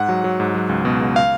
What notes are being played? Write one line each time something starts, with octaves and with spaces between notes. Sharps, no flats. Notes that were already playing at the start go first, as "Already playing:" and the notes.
Already playing: G#2 F#5
F#3
F#3
G#2
F#3
C#2
B2
C#2
F5